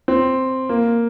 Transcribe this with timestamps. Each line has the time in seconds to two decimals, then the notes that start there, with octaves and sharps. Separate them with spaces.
0.08 C4
0.69 A#3